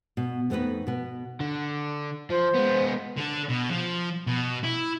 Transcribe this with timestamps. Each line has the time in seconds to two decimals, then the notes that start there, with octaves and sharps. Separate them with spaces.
0.17 B2
0.50 F2 A3 B3 D4 D#4 B4
0.87 B2 B3
1.40 D3
2.30 F3 C5
2.54 G#3 B3
3.17 D3 D4
3.49 B2
3.70 F3
4.27 B2
4.63 E4